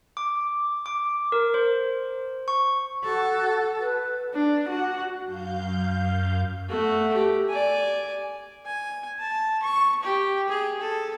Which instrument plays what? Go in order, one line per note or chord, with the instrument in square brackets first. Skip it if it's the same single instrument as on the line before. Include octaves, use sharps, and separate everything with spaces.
[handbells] D6
D6
A#4
C5
C#6
[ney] F#4 [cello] A4
[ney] B4
[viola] D4
F#4 F#5
[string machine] F#2 F5 G6
[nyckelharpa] A3 F#4
G4
D5 G#5
G#5
A5
C#6
G4
G#4
A4